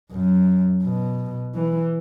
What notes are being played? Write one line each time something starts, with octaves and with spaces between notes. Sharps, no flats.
F#2
B2
E3